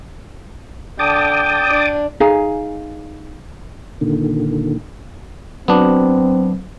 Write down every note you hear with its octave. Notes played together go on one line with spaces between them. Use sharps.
D3 G5 A5 D6 D#6
D4
D#4 G#4 F5 G#5
A#2 D3 D#3
F#3 B3 C4 D4